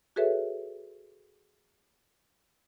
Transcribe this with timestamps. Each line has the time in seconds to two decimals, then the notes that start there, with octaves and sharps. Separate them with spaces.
0.16 F#4 G#4 A4 B4 C#5 E5